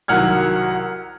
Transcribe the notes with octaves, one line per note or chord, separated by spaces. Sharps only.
C2 D#3 F#3 F#5 F6 G#6